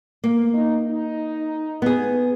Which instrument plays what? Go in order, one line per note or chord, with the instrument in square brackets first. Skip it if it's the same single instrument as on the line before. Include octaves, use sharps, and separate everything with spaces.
[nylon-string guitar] A#3
[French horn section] D#4
D#4
[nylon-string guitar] B3 G#4